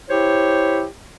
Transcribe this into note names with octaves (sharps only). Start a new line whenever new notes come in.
E4 G4 C5 C#5